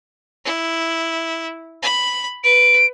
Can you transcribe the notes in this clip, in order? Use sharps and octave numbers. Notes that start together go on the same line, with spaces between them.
E4
B5
B4 D7